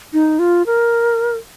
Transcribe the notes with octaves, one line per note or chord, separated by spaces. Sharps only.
D#4
F4
A#4